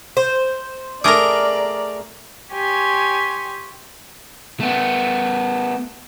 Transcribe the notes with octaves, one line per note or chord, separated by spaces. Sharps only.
C5
A3 G#4 A#4 D5 A#5 D6
G4 C#5 G#5 C6
A3 B3